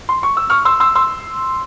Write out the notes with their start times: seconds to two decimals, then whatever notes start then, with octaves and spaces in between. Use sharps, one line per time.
0.09 C6
0.23 C#6
0.37 E6
0.50 C#6 F6
0.65 C6 E6
0.80 C6 E6
0.95 C6 E6